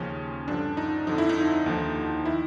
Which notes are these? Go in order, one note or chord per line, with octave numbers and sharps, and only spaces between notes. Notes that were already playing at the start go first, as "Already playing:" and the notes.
Already playing: D#2 C#3 F3 C#4
G2 D3 F3 D4
D#4
F2 D3 F3 D#4
E4
D#4
D#2 D3 F3
D#3 E4